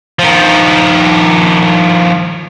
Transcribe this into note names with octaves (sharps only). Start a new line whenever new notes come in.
D#3 F3